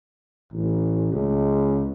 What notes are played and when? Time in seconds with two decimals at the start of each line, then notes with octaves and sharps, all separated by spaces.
0.53 A1
1.12 C#2